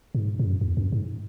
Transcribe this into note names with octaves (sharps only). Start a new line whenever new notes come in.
G#2
G#2
F#2
E2
F#2
G#2